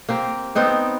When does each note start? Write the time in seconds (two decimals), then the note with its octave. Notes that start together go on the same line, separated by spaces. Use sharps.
0.09 A#3 C4 G4
0.55 B3 C4 D#4 D5